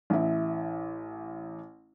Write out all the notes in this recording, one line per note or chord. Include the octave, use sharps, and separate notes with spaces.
A1 E4